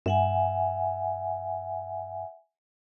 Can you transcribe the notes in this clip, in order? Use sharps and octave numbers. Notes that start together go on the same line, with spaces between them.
G2 E5 F#5 G#5